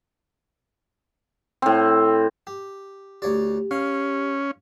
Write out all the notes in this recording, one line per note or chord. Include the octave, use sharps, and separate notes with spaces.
A2 C4
G4
D2 G4 C#5 D5
C#4 F5